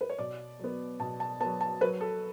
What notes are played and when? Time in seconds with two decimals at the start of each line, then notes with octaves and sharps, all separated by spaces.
0.01 B4
0.10 C#5
0.18 B2 D5
0.59 F#3 B3
1.00 B2 A5
1.20 A5
1.40 B3 A5
1.44 F#3
1.61 A5
1.81 F#3 B4
2.01 A4